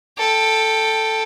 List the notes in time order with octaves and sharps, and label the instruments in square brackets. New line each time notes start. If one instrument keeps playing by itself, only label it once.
[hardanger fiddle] A4 G5